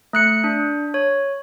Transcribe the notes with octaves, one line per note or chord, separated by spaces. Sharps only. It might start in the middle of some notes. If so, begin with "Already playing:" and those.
A3 F#6 C#7
D4
C#5